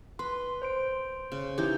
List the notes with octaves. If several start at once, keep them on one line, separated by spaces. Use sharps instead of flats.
B4 C6
C5 C6 D7
C#3
E3 D#4 G4 G6